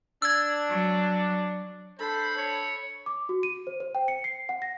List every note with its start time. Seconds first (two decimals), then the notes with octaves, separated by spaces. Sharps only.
0.22 D4 E6 G#6
0.69 F#3
1.99 D4 A4 C5 B5
2.37 C#5
3.06 D6
3.29 F#4
3.43 D#7
3.67 C5
3.80 C5
3.95 G5
4.08 C#7
4.24 C7
4.49 F#5
4.62 A#6